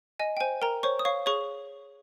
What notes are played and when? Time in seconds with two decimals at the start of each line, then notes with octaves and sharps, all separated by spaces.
0.20 D#5 G#5
0.37 G5
0.40 C5 G#5
0.62 A#4 G5 A#5
0.83 C5 C#5 C#6
0.99 D#6
1.05 C#5 F5 C#6
1.26 G#4 C#5 C#6